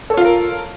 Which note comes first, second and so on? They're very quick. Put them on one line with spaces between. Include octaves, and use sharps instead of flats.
A4 C#5 F4 F5 A#4